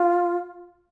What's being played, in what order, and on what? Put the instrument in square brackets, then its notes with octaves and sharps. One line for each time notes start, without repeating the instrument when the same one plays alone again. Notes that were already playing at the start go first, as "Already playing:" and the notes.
Already playing: [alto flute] F4